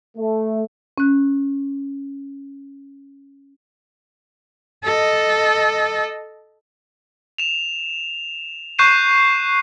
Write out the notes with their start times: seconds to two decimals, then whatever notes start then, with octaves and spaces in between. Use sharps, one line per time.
0.18 A3
0.98 C#4 F#6
4.84 A4 D#5
7.38 E7 F7
8.79 C#6 F#6 G6 C7 D#7 E7